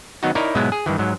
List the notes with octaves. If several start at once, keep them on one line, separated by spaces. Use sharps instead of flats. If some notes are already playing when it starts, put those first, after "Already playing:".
D#3 F#3 B3 D#4 F#4
D#4 E4 A#4 C#5 D5
G#2 B2 F#3 G#3 B3 E4
G#4
G2 D#3 E3
G#2 F#3